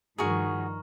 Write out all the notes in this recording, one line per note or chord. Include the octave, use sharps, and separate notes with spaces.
G2 D#3 F3 F#4 G#4 A#5 C#6 F6